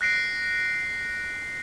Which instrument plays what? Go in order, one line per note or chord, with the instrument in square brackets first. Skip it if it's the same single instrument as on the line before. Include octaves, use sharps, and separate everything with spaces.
[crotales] F#6 A#6 C7 D7